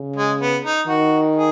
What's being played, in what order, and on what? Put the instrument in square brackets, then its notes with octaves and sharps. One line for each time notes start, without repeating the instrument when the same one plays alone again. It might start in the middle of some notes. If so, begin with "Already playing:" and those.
Already playing: [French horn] C#3
[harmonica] G#3
B3
D#4
[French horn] D#3 [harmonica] F#4
[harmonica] G#4